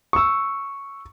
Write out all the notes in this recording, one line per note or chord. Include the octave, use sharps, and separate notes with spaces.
C#6 E6